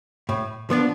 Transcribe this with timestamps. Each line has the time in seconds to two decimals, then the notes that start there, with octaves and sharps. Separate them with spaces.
0.29 A2
0.70 F3 B3 D4